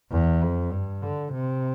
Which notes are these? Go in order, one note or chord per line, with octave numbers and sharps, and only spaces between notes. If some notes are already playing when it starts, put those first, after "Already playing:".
E2
F2
G2
D3
C3